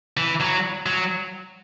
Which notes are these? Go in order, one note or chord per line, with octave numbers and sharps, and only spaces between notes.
E3
F#3
F#3